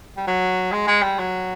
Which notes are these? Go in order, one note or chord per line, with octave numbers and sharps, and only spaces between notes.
G3
F#3
G#3
G#3
G3
F#3